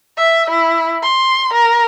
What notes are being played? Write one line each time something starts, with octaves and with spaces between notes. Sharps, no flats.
E5
E4
C6
A#4